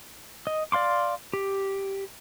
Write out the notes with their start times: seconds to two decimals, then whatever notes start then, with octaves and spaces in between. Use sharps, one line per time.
0.47 D#5
0.72 D5 F5 C6 D6
1.33 G4